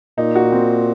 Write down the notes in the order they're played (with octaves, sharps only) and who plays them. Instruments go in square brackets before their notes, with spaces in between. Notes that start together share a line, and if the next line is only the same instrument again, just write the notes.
[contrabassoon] A#2 [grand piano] D#4
[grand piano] F#4
C4